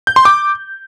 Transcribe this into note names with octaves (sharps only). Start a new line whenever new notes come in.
G6
C6
D6